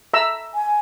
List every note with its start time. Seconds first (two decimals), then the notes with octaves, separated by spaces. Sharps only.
0.14 E5 A#5 E6
0.54 G#5